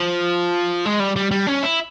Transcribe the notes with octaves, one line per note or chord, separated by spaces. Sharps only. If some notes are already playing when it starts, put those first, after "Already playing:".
Already playing: F3
G#3
G3
G3
G3
C#4
E4